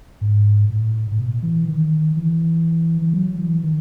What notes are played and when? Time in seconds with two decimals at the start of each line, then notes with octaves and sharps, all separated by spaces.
0.21 G#2
0.70 A2
1.11 A2
1.19 B2
1.43 E3
1.68 D#3
2.17 E3
3.02 E3
3.14 F#3
3.39 E3
3.63 D#3